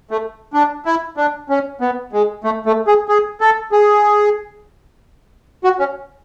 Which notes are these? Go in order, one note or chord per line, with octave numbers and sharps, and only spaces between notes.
A3
D4
E4
D4
C#4
B3
G#3
A3
A3
G#4
G#4
A4
G#4
F#4
C#4